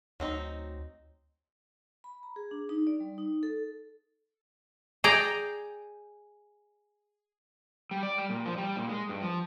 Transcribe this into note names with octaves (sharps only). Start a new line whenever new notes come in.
D2 F#3 C4 D#4
B5
A#5
G#4
D4
D#4
D5
G3
D#4
A4
G#4 D5 G5 A#5
G3
D5
G3
A#2
F3
G3
A#2
G#3
G2
F3